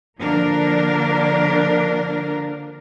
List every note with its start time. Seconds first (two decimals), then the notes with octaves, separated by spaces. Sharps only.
0.18 D3 F3 A#3 D4 A#4